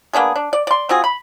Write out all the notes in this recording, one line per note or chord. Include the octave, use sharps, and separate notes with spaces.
A#3 B3 D4 G#4
D4
D5
D5 C6
C4 F4 F#4 G#4
B5